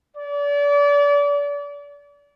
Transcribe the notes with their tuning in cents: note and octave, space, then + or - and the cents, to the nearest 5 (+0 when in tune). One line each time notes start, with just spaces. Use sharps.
D5 -35